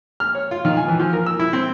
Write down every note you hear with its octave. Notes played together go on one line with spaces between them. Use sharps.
F6
C#5
F4
D#3
G#5
E3
F3
A#4
E6
E4
C4